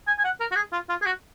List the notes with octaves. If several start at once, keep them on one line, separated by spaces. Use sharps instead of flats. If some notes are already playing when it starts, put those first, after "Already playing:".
G#5
G#5
F#5
A#4
F#4
G#4
F4
F4
G#4
F#4